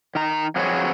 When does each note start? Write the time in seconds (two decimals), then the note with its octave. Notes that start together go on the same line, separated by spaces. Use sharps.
0.15 D#3 A#5
0.56 F3 F#3 C4 G#4 B4 C#5